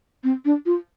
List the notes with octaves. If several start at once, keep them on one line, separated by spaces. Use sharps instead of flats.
C4
D4
F4